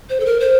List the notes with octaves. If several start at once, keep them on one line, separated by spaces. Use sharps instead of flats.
C5
A4
A#4
C5